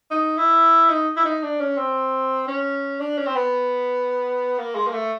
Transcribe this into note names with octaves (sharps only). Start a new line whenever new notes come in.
D#4
E4
D#4
E4
D#4
D4
C#4
C4
C#4
D4
C#4
C4
B3
A#3
G#3
A#3
A3